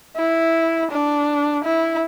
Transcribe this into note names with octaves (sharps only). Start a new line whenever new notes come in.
E4
D4
E4